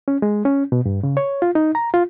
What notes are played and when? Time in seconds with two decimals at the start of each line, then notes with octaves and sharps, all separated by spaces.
0.08 C#4
0.22 G#3
0.45 C#4
0.72 B2
0.85 G2
1.03 C#3
1.17 C#5
1.42 F4
1.55 D#4
1.75 A#5
1.94 F4